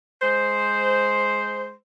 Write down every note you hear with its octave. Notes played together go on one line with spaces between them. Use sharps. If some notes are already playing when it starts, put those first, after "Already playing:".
G#3 C5